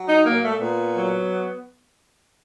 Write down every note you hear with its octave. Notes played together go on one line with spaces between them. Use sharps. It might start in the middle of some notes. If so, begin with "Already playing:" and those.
Already playing: F#3
D#4
A#2 A#3
A3
A#2 B3
F#3